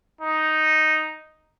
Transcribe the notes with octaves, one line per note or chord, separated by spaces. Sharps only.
D#4